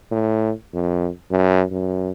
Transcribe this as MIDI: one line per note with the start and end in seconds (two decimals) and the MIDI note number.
0.11 0.51 45
0.74 1.09 41
1.31 1.64 42
1.71 2.11 42